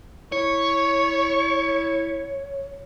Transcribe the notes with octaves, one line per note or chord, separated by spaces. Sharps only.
E4 C#5 C#6